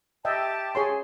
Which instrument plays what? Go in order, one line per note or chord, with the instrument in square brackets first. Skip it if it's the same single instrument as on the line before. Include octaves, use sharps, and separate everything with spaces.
[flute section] G4 A5 [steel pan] D#5 E5 G5
[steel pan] G#4 C#5 C6